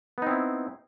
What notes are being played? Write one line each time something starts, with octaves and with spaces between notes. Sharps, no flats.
B3 C4 D#4 E4